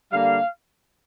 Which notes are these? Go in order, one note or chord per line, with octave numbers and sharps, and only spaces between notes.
D3 G3 A#3 F5